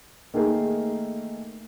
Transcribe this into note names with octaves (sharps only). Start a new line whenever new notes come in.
D#3 A3 A#3 G#4 A#4